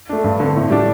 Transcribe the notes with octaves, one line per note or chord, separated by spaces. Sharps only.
A3 D4
G2
D3 C4
A2
G3 D4